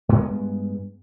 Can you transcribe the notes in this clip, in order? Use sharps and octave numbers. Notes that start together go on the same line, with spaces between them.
G2 G#3 B3